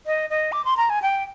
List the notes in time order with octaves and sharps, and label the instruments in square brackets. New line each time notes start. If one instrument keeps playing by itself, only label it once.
[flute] D#5
D#5
D6
C6
A#5
G#5
G5